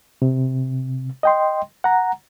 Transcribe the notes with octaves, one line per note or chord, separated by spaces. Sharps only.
C3
D#5 G5 C6
F#5 A#5